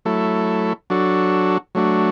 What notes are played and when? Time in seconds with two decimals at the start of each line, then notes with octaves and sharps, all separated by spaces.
0.05 F#3 A3 E4 A4
0.90 F#3 D4 F#4 A4
1.75 F#3 A3 D4 F#4